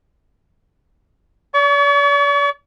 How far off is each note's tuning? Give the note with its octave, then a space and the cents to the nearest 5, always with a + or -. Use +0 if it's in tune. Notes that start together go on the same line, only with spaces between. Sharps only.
D5 -45 C#6 +35